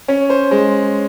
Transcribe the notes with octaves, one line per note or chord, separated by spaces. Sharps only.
C#4 C#5
C5
G#3 C5